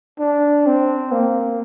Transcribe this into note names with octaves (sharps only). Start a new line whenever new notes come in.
D4
C4
A#3